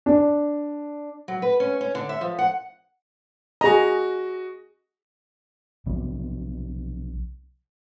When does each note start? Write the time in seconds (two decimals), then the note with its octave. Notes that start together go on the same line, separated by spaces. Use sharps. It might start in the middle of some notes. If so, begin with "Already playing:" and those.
0.06 D4
1.28 F#3
1.42 B4
1.60 C#4
1.81 C#4
1.95 D3
2.09 E5
2.21 F3
2.39 F#5
3.61 F#4 G#4 D#5 A#5
5.86 B1 C3 F3